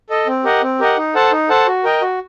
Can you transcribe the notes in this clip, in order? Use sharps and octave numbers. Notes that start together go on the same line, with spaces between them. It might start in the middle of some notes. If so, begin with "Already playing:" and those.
A4 D#5
C4
G4 A#4 D#5 F#5
C4
G4 A#4 D#5 F#5
D#4
A4 C5 F#5 A5
D#4
A4 C5 F#5 A5
F#4
A#4 D#5 G5
F#4